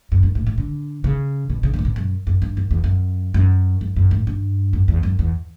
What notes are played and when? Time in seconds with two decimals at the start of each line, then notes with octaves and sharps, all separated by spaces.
0.12 F#2
0.23 G2
0.35 A2
0.47 A2
0.58 D3
1.04 C#3
1.50 B2
1.63 C#3
1.74 D3
1.79 A2
1.85 B2
1.96 F#2
2.27 F#2
2.42 G2
2.57 F#2
2.71 E2
2.84 F#2
3.34 F#2
3.81 F#2
3.96 F#2
4.11 A2
4.27 G2
4.73 F#2
4.88 E2
5.03 F#2
5.19 E2